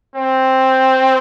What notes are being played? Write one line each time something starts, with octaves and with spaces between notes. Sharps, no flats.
C4